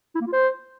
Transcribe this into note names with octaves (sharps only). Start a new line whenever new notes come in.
E4
A#3
F4
C5